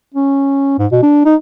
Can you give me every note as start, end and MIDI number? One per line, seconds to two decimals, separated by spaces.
0.14 0.76 61
0.79 0.86 44
0.91 0.99 47
1.03 1.23 62
1.26 1.35 63